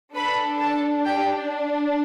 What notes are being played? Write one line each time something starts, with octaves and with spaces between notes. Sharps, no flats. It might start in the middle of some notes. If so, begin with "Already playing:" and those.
D4 A4 B4 B5
A4 A5
G4 G5